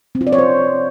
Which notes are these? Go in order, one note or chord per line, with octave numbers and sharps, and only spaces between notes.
C4
F4
D5
C#5
C5